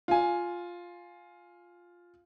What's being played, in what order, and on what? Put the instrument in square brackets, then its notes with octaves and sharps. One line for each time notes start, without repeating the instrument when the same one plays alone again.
[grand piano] F4 G#5